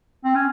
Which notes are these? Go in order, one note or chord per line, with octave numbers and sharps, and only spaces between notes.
C4
C#4